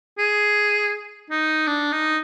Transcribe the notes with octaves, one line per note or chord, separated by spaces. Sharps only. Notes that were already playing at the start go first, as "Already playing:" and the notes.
G#4
D#4
D4
D#4